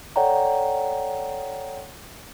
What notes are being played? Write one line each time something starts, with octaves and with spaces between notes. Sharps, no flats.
A4 C#5 D5 F#5 G5 A#5